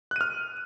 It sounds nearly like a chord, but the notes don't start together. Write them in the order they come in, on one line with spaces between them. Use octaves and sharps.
F#6 D#7 F6